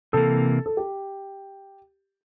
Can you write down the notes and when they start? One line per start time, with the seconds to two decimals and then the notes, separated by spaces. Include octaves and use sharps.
0.13 C3 E3 A#3 A4
0.66 A4
0.77 G4